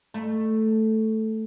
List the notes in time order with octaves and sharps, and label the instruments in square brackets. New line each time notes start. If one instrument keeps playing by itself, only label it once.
[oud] A3